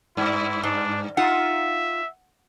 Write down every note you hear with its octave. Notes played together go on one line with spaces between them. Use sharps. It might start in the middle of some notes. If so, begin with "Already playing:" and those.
G2 E4
G#2 D4
D#4 F4 E5 F#5